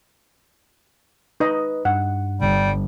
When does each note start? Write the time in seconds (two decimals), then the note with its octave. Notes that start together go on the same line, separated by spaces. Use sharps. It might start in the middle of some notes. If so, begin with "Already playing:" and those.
1.40 D#4 B4 D#5
1.85 G2 F#5
2.41 G1 G3